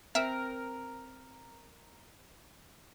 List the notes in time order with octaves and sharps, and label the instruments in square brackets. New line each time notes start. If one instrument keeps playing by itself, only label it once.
[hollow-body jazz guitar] C4 [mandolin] A#4 [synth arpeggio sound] E5